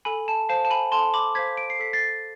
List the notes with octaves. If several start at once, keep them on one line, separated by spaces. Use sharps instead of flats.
A4 G#5 B5
A5
C5 F5 A5
A5
G#5 B5
A4 A5 C6
B5 D6
C5 F5 G#6 B6
D7
C7
A4 B6
A6 C7